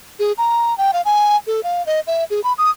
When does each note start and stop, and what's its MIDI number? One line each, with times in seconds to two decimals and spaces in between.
0.19 0.32 68
0.38 0.77 82
0.78 0.91 79
0.93 1.02 77
1.05 1.37 80
1.47 1.61 69
1.64 1.84 77
1.86 2.00 75
2.07 2.24 76
2.30 2.41 68
2.44 2.53 83
2.58 2.70 87